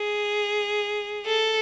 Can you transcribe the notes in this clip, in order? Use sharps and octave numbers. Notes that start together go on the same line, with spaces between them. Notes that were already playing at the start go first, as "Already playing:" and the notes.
Already playing: G#4
A4